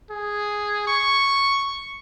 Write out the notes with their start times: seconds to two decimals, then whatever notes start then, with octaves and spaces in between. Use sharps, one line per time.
0.11 G#4
0.87 C#6